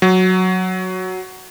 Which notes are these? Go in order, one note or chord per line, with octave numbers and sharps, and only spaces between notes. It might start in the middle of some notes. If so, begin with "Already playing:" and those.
F#3